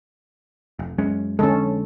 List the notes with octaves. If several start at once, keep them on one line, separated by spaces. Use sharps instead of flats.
F1
F#2 G#3 C#4
F2 D3 G#3 C#4 A4